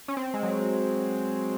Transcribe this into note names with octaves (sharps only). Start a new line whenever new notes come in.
C#4
C4
G#3
F#3